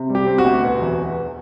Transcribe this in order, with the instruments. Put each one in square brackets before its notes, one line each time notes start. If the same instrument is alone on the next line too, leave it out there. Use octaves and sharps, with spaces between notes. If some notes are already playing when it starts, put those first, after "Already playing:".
Already playing: [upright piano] C3
G3
[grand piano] G4
[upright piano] C4
[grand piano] F#4
[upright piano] D2
B2
E2